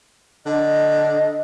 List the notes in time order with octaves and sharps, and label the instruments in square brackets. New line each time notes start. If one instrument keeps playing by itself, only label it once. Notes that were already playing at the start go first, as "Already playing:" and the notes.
[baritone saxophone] D3 [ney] D#5